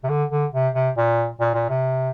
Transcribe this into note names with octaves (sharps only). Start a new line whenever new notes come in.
C3
D3
D3
C3
C3
A#2
A#2
A#2
C3